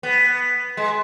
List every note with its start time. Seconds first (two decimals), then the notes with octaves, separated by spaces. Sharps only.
0.03 B3
0.77 G#3